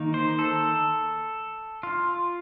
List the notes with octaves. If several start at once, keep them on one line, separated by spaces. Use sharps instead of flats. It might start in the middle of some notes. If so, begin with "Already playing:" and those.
Already playing: D#3 A#3 D#4
C5
A4
F4